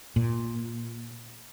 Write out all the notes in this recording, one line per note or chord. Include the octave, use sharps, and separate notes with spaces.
A#2